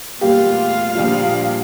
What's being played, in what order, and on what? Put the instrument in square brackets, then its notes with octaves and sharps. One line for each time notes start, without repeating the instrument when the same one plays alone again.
[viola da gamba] E2 A3 F4 [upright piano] A#2 G3 G4 [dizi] F5
[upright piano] A#1 D4 F4 [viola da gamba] A#2 F3 G3